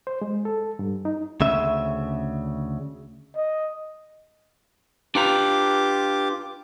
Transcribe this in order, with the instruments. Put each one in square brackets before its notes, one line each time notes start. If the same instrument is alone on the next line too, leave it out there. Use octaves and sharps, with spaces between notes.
[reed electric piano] C5
G#3
A4
G2
D#4
[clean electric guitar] D2 C#3 E5
[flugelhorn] D#5
[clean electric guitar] D4 B4 A#5 [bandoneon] F4 G4 D6